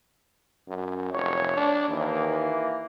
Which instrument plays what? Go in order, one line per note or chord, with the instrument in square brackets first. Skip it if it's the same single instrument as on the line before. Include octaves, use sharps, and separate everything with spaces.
[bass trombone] F#2
[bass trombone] F1 [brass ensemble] C#5
[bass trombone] D4
[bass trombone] D#2 [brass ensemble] E3 A#3